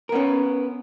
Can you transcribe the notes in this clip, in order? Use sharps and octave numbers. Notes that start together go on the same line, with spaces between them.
B3 C#4 A#4